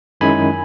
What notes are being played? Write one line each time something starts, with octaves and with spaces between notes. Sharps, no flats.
F#2 D#3 G#3 C#4 E4 G#5 B5